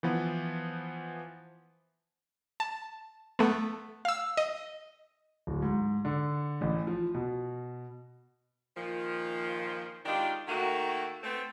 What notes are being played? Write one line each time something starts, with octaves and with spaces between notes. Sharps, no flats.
E3 F3 B3
A5
A3 B3
F5 E6
D#5
D1
G#2
D3
A1
F3
B2
A#2 D#3 F3
D#3 G#3 D4 F4 G4
D#3 A3 A#3 F#4
A3 B3 C4